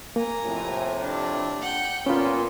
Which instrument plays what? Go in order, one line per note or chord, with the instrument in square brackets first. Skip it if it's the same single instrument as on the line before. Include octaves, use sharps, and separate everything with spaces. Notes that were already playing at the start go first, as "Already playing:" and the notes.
[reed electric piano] A#3 [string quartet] G#5 A#5
[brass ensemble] F2 A2 C3
[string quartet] D4
F#5 G5
[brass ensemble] A#2 [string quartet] B3 [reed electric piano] C#4 F4